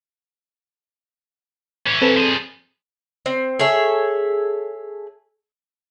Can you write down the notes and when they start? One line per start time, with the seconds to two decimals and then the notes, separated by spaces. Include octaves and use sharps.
1.87 E3 C#4
2.02 C4 A4 B4
2.16 F3 G#4
3.26 C4
3.59 G#4 A4 C#5 E5